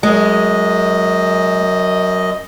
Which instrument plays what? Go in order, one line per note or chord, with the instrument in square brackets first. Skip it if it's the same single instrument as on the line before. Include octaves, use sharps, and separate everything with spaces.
[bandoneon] F#2 D#5 [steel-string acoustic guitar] G#3